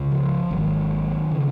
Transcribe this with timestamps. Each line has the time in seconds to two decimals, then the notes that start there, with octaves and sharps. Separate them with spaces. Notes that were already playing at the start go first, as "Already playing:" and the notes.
Already playing: C#2 C#3
0.12 F3
0.51 G#1 G#2 D#3 F#3
1.31 C#3